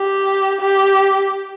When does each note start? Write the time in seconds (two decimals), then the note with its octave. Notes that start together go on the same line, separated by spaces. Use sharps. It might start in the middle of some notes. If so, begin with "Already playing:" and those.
Already playing: G4
0.61 G4